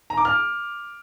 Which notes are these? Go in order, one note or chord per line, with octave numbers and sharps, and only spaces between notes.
A#5
D6
F6